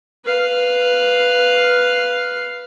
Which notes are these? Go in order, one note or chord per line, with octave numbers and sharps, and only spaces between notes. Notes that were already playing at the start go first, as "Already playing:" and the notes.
B4 F5